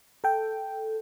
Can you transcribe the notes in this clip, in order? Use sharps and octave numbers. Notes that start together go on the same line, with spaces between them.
A4 G5